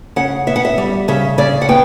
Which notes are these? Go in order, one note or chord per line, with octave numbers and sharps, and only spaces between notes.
C#3 F#5
B3 E5
F#5
E5
G3
C#3 E5
C#3 D5
F#5
B3 G5